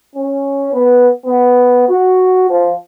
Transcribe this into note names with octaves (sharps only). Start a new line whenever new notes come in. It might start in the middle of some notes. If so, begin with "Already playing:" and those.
C#4
B3
B3
F#4
F3